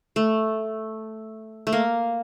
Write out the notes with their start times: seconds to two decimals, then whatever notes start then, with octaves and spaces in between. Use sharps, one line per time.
0.16 A3
1.67 A3
1.73 A#3